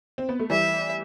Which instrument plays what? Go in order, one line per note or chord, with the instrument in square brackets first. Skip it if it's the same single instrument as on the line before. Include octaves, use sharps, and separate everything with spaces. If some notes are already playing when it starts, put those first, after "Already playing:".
[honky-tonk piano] C4
B3
A3
[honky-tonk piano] E3 G3 [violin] E5